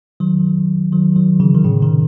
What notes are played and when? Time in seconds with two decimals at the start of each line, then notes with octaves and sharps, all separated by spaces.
0.20 D#3 F#3
0.92 D#3 F#3
1.16 D#3 F#3
1.40 C#3 E3
1.54 D#3
1.64 A2 C#3
1.82 C3 D#3